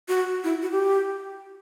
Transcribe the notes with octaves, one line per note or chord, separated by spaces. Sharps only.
F#4
E4
F#4
G4